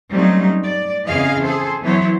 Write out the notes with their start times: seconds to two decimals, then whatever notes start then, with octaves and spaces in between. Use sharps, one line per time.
0.12 F#3 G3 A3 C4 C#4 D#4
0.63 D5
1.08 F2 C#3 E3 G#4 D#5 F5
1.45 G#4 A4 C5
1.83 E3 F#3 B3 E4 C5 C#5